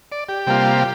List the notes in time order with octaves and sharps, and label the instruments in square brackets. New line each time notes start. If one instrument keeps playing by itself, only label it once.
[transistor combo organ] D5
G4
C3 G3 A#3 F4